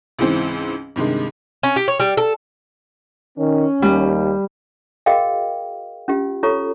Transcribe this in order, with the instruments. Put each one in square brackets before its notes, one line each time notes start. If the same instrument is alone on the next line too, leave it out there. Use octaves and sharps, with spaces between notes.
[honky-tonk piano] C#2 G#2 E3 C4
G2 C3 D#3 G#3
[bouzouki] C#4
G4
C#5
G3
A4
[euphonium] D#3 [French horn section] C#4
[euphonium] D#2 [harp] G3
[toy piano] F#4 G#4 A#4 D#5 F5 G5
C#4 F4 G4
F4 A4 C#5 A#5 C#6